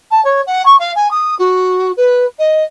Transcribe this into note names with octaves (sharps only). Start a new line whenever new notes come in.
A5
C#5
F#5
C#6
F5
G#5
D#6
F#4
B4
D#5